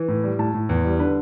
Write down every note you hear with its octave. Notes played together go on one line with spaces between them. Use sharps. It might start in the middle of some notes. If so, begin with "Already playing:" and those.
Already playing: E3
A2
G3
A2 A5
A2
E2
G3
D3 B4